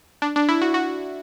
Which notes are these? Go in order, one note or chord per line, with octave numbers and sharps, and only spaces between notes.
D4
D4
E4
F#4
F#4